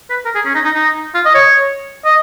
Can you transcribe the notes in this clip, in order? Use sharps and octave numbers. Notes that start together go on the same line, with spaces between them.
B4
A#4
G#4
C#4
D#4
D#4
D#4
F4
D#5
C#5
D#5